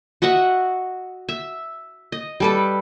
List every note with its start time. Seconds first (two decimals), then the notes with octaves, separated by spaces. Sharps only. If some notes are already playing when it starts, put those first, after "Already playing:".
0.22 F#4 D#5 E5 F#5
1.29 E5
2.12 D#5
2.40 G3 A4 B4